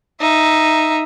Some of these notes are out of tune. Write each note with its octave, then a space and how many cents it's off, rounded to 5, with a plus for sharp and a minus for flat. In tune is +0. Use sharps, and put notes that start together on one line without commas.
D#4 +0 E5 +5